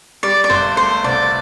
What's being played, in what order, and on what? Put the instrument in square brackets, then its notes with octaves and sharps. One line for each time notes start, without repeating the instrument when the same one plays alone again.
[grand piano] G3 [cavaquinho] D5
[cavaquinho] D5
[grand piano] G1 [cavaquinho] C5
[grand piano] A3 [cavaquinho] C5
[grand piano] C2 [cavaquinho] D5